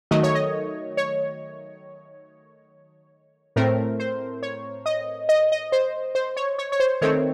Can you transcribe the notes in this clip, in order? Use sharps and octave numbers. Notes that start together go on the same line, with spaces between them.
D#3 F#3 A3 D#5
C#5
D#5
C#5
A2 A3 C4 A#4
C5
C#5
D#5
D#5
D#5
C5
C5
C#5
C#5
C#5
C5
D#3 A3 C4 C#5